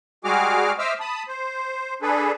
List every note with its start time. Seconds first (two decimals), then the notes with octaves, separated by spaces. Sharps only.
0.24 G3 G#3 F#4 G#4 D6 F6
0.79 C5 D#5 E5 D6 E6 F6
1.00 A5 B5 D#6
1.27 C5
2.02 D4 G#4 A4 B4